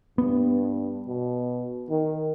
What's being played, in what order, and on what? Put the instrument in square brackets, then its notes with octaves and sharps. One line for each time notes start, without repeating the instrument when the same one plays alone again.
[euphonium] G2 [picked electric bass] B3
[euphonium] B2
D#3